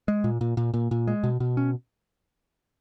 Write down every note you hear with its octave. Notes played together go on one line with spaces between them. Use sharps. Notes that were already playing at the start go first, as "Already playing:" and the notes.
G#3
A#2
A#2
A#2
A#2
A#2
G#3
B2
B2
C#4